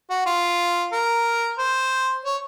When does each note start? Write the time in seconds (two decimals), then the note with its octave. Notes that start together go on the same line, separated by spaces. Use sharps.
0.10 F#4
0.26 F4
0.92 A#4
1.59 C5
2.25 C#5